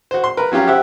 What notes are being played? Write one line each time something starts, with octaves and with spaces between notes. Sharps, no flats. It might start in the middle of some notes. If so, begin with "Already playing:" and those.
F#4 C5
C6
A#4 B4
F#3 C#4 F4 G4
G4 C5 E5 F#5